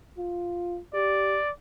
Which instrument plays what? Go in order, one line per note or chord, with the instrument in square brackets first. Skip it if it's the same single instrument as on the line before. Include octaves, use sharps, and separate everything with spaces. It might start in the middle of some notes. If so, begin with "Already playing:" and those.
[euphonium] F4
[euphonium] G4 [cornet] D5